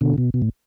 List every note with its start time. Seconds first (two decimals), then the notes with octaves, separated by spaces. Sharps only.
0.01 B2 D3
0.18 B2
0.34 B2
0.42 A2